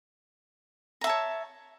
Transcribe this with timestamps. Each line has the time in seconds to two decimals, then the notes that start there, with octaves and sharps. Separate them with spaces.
1.01 A#5
1.04 E5
1.07 A5
1.09 C#5